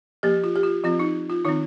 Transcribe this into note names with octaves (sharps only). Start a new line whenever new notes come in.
F3 A#3 G4
F4
G4
F4
F3 C4 F4
D#4
F4
D#3 C4 D#4